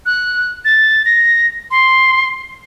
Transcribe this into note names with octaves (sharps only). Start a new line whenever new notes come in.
F#6
A6
A#6
C6